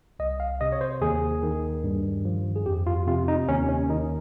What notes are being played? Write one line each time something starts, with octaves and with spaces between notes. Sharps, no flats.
C2 D#5
F5
C3 D#5
C#5
C5
D#2 G#4
D#3
G2
F3
G#4
F2 G4
F4
C3 F4
D#4
D#2 C#4
C#4
D#3 D#4